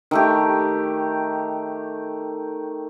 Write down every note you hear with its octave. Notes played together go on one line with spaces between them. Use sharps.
D#3 A3 G4